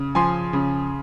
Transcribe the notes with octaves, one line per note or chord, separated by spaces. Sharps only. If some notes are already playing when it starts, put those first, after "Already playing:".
Already playing: C#3
F3 G#5 C6
C#3